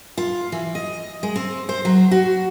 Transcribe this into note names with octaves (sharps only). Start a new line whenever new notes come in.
F4
E3
D#5
G#3
C4
C5
F#3
F#4